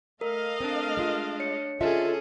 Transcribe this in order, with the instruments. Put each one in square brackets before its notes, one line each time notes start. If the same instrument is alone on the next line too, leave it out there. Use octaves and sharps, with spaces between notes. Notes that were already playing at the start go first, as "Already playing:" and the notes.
[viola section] A3 D#5 F5 [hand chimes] A#4
[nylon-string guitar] C4 [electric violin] D4
[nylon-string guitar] G#3 F4
[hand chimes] C#5 C#7
[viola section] D3 A4 [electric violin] C#4 G#4 [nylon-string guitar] F4 D#5 E5